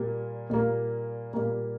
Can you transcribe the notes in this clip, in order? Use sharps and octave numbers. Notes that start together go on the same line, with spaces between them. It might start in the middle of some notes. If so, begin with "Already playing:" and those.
Already playing: A#2 G3 A#3
A#2 G3 A#3
A#2 G3 A#3